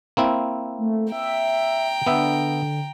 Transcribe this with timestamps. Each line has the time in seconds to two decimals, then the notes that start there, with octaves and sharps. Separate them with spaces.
0.17 A#3 C4 E4
0.78 A3
1.12 E5 G5 A#5
2.07 D3 B3 E5